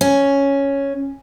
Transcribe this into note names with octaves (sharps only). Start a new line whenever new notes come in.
C#4